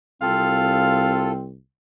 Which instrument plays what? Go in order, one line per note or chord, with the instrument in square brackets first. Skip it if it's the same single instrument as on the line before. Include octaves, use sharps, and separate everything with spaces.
[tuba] C2 [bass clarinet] C4 [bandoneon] F4 A4 [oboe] F5